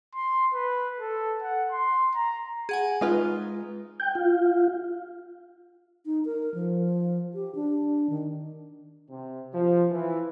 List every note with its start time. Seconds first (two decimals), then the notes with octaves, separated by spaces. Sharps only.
0.15 C6
0.54 B4
1.00 A4
1.43 F#5
1.72 C6
2.15 A#5
2.69 G#4 F#5 G#5
3.01 G#3 D#4 F4 B4
4.00 G5
4.15 F4
6.06 D#4
6.25 A#4
6.54 F3
7.34 G4
7.55 D4
8.10 D#3
9.10 C3
9.53 F3
9.91 E3